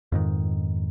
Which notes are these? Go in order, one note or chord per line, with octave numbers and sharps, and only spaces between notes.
F2 G#2 D#3